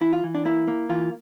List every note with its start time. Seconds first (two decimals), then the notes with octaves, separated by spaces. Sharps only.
0.01 E3 E4
0.13 F4
0.24 E3
0.35 D4
0.45 A#3 E4
0.67 A#3
0.89 E3 F4